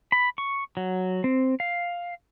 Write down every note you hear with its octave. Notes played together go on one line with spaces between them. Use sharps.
B5
C#6
F#3
C4
F5